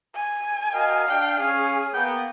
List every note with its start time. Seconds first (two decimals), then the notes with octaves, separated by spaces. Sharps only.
0.15 G#5
0.74 F#4 A#4 D#5 F5
1.08 D4 G5
1.40 C#4 G#4 F5
1.94 A#3 B3 G5